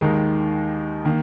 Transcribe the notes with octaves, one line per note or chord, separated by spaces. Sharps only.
D#2 D#3 G#3 D#4
D#3 A#3